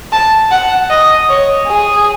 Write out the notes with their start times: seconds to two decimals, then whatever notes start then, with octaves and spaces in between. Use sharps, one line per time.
0.12 A5
0.51 F#5
0.90 D#5
1.29 C#5
1.68 G#4